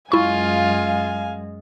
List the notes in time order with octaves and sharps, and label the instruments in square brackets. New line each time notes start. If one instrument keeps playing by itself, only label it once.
[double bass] F#2 G#3 [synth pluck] E4 C#6 [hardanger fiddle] F4 [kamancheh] F5 G#5